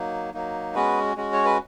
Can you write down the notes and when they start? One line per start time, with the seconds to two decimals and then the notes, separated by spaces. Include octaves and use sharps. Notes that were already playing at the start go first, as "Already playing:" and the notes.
Already playing: F#3 A#3 D#4
0.34 F#3 A#3 D#4
0.75 G#3 B3 C#4 F#4 B4
1.16 G#3 C#4 F#4
1.33 C#5
1.45 B4